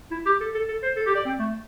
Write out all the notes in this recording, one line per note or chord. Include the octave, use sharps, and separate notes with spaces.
E4
G4
A4
A4
A4
C5
A4
G4
D5
C4
A3